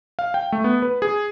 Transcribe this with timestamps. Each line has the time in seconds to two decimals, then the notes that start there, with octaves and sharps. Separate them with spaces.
0.19 F5
0.34 G5
0.52 A3
0.64 B3
0.82 B4
1.02 G#4